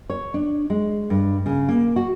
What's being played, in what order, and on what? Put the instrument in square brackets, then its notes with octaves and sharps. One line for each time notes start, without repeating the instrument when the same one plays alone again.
[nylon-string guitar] C#5
D4
G#3
G2
C#3
A#3
F#4